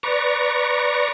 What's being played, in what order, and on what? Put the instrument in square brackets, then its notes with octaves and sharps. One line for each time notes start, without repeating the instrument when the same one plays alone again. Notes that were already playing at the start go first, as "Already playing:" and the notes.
[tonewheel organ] B4 D5 A#5 C#6